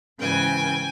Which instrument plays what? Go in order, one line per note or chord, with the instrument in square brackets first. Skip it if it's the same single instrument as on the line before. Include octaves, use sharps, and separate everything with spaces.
[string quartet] G#2 C#3 E3 [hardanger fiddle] G5 G#5